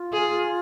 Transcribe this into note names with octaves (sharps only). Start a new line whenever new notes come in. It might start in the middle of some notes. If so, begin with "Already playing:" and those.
Already playing: F4
G#4